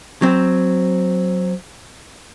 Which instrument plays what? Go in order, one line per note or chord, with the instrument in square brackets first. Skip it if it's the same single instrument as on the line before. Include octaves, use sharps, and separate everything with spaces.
[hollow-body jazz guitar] F#3 C4